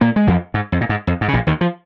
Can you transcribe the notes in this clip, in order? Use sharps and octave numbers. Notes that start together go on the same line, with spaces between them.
A#2 A#3
G#3
F2 F3
G#2
F2
A#2
G#2
F2
G#2
C#3
A#1 A#2
D#2 D#3
F3